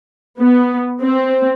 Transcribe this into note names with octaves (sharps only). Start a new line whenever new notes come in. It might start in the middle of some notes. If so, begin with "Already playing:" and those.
B3
C4